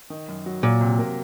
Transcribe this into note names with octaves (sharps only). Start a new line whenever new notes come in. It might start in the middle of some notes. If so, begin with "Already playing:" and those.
D#3
F#2
F#3
A#2 F#3
C3
A#3